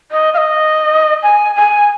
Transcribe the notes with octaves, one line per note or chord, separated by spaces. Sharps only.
D#5
F5
D#5
G#5
G#5